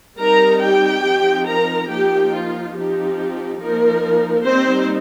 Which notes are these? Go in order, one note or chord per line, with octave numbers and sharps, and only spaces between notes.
G3 C4 D#4 A#4 A#5
G4 G5
F3 C4 D#4
A#4 A#5
F3 A#3 D#4 G4 G5
F4
F3 C4 D#4 G4
F3 A#3 D#4 A#4
G3 A#3 C4 D#4 C5